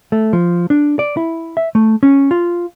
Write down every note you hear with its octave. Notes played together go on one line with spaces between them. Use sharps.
A3
F3
D4
D5
E4
E5
A3
C#4
F4